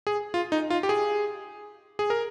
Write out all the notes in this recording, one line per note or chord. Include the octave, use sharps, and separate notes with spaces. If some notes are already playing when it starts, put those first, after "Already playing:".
G#4
F4
D#4
F4
G4
G#4
G#4
A#4